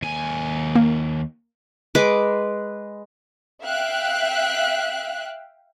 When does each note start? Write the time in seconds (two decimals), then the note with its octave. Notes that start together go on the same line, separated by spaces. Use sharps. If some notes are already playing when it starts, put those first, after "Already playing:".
0.02 D#2 G#5
0.75 A#3
1.95 G#3 B4 D6
3.64 E5 F5 G5 F#6